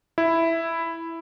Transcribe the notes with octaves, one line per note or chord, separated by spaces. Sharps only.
E4